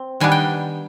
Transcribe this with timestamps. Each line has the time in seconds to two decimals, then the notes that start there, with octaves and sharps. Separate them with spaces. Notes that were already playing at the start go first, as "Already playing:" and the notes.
Already playing: C4
0.20 D#3 G3 B3 D4 G#5
0.32 G5